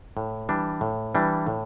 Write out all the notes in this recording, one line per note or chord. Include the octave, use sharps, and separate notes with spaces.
A2
E3 G3 D4
A2
E3 G3 D4
A2